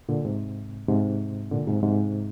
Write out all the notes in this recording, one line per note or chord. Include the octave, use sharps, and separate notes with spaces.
A#2 D3
G#2 C3
G#2 C3
A#2 D3
G#2 C3
G#2 C3